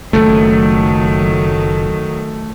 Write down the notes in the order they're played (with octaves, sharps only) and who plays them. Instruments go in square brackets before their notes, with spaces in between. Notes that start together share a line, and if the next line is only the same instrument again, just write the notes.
[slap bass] F#1 F2 [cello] D#3 F#3 [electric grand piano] A3